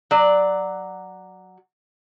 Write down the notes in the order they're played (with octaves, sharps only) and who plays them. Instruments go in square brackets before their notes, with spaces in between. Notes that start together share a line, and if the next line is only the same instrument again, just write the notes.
[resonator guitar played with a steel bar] F#3 D5